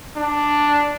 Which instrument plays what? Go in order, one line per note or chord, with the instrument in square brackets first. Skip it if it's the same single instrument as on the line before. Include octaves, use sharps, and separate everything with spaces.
[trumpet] D4